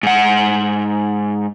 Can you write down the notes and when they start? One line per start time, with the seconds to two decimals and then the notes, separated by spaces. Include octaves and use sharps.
0.03 G#2 F#5